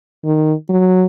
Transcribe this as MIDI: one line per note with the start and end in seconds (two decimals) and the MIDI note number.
0.25 0.53 51
0.69 1.06 54